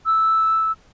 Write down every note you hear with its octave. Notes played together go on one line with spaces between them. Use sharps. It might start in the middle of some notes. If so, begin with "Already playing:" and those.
E6